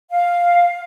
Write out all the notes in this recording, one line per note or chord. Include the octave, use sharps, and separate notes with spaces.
F5